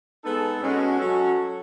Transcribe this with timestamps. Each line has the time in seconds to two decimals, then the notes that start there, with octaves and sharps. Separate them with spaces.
0.24 G#3 B3 D#4 A4
0.61 B2 G#3 C#4 F#4 A4
0.98 F#3 C#4 F#4 A4